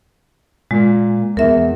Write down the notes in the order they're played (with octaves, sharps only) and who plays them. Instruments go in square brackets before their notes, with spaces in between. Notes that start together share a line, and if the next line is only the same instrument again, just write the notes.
[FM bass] A#2 [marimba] G#3
[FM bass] E2 [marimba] A#4 E5